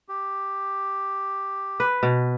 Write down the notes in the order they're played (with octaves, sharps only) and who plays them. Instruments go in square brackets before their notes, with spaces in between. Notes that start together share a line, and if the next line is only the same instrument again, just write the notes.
[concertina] G4
[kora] B4
B2